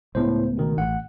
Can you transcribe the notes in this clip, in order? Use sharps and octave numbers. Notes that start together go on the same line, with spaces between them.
C#2 A2 A3 B3 C5
B2 D#3
A1 F#5